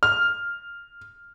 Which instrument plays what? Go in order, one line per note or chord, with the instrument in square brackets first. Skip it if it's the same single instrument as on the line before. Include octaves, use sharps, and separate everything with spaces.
[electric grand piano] F6